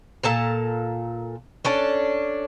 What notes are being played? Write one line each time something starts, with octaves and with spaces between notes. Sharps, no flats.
A#2 A4 A5 A#5
C#4 D4 A4